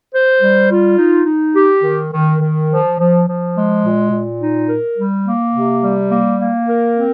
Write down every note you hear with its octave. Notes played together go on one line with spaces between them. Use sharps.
C5
G3
F4
D#4
D#4
G4
D#3
D#3
D#3
F3
F3
F3
G#3
A#2
A#2
D#4
A#4
G3
A#3
C3
G3
A#3
A#3
A#4
C4